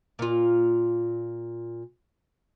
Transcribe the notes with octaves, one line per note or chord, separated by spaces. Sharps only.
A#2 F4